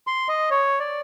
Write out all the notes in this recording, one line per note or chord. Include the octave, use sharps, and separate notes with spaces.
C6
D#5
C#5
D5